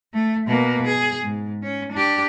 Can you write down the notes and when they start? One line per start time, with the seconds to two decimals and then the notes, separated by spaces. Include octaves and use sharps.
0.13 A3
0.47 B2 A#3
0.86 G#4
1.23 G#2
1.63 C#4
1.92 D4 G4